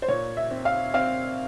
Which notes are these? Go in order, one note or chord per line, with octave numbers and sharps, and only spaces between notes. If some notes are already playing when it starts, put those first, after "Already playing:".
C5
A#2 C#5
E5
C4
F5
C4 F5